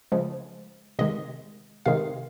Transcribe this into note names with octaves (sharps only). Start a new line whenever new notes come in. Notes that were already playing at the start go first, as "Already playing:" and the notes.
C#3 F3 G#3
C3 D#3 G#3 D#5
C3 D#3 G#3 F5